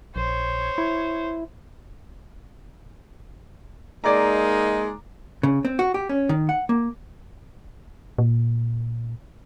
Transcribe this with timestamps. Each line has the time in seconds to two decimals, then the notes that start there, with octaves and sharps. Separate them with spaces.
0.16 A#1 C5 C#5
0.78 E4
4.04 G#3 A#3 D#4 D5 A#5
5.43 C#3
5.65 C4
5.79 F#4
5.94 G4
6.09 C#4
6.29 D#3
6.49 F#5
6.69 A#3
8.18 A#2